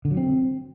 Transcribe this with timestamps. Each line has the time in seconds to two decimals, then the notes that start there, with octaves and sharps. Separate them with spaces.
0.05 D3
0.11 F#3
0.17 C4